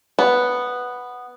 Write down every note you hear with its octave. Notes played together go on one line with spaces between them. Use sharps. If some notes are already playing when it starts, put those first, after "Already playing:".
B3